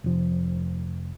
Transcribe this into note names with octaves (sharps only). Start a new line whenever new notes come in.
F1 F3